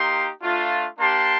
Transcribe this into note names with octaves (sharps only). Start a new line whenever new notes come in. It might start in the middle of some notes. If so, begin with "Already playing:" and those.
Already playing: A#3 D#4 G4 C6
A3 D4 F4
A#3 D4 G4 A5 C6